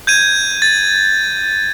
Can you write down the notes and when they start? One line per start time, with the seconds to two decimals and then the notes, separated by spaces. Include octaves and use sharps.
0.07 G6 G#6 D#7
0.62 A6